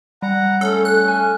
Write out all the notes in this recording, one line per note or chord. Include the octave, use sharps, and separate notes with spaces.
G3 F#5 A#5
A3 C#4 A4
F#6
G#5